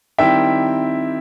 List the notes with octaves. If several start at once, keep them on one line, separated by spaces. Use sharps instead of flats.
D#3 G3 C4 E4 E5 G5